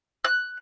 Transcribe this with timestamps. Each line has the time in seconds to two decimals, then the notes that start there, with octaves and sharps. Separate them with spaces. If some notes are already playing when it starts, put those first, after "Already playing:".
0.25 F#6